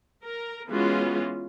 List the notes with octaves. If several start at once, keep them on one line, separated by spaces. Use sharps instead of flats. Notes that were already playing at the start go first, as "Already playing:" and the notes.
A#4
E3 G#3 B3 C#4 F4 F#4